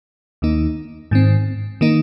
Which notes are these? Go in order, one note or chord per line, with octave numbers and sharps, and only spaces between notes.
D#2 D#3 A#3 D#4
G#2 D#3 C4
D#3 A#3 D#4